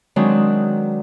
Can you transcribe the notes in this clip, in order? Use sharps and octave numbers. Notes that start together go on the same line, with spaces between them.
D#3 F#3 G#3 C4 D4